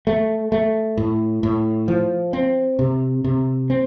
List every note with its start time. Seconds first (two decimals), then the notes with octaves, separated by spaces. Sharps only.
0.07 A3
0.52 A3
0.97 A2
1.43 A2
1.88 F3
2.33 C4
2.79 C3
3.24 C3
3.70 C4